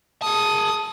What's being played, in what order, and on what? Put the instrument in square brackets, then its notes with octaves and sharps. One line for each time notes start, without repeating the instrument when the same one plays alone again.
[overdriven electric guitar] G#4 A5 [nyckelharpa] D#6